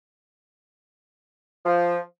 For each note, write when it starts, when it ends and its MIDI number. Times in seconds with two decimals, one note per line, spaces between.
1.65 1.97 53